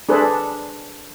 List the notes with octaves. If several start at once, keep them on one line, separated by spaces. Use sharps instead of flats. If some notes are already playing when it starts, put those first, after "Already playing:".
D4 G#4 A4 B4 C5